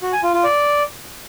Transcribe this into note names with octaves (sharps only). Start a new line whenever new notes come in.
F#4
G#5
F4
F4
D5